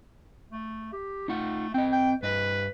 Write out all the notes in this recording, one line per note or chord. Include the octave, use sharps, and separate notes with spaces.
A3
G4
A3 D#4 F4 F#5
C4 D#5 G5
G5
G2 B4 D#5